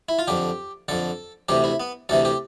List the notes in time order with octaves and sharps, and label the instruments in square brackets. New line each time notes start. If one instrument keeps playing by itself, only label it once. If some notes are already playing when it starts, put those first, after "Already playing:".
[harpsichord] E4
F4
F2 D3 G4
F2 D3 A4
D2 C3 E3 G4
E4
B3
D2 C3 E3 A4
G4